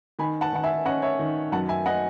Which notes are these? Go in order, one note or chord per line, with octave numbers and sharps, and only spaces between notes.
D#3 G#5 B5
F#5 A5
D#3 F#5
E5 G#5
C#4 D#5 F#5
C#5 E5
D#3
F#2 F#5 A5
E5 G#5
D#5 F#5